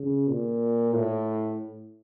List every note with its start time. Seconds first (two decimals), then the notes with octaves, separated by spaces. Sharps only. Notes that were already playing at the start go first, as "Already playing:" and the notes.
Already playing: C#3
0.28 A#2
0.93 A2